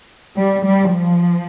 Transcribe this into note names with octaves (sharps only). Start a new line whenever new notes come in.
G3
G3
F3